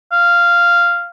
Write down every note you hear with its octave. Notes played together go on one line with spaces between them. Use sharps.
F5